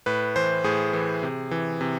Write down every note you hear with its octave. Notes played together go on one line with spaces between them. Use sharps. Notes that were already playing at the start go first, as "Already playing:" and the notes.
A2 B4
E3 C5
A2 G#4
E3
C3
E3
C3